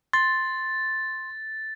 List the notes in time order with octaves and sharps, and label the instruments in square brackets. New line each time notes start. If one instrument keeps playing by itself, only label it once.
[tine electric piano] C6 [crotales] A6